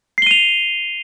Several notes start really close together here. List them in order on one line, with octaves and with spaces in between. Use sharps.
C7 G7 D#7 F7